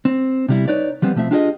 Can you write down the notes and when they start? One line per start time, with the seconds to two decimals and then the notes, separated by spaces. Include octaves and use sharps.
0.05 C4
0.48 C3 G3 E4
0.68 D#4 B4 C#5 D5
1.02 F3 G3 B3 C4
1.15 B1 F3 A3 C4 E5
1.31 D4 F4 G4 G#4 C#5 D#5